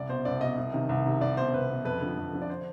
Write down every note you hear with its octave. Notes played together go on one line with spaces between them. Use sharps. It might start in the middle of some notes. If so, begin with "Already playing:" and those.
Already playing: C2 D5
B2 C5
C2 D5
B2 D#5
C2
C3 D#3
C2
C3 D#3
C2 D5
B2 C5
C2 B4
B2
F2 B4
D3 F3
F2
D3 F3
D5
C5